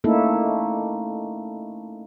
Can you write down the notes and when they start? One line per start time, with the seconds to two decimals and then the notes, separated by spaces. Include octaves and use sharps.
0.04 A3 A#3 C#4 D#4 E4 A4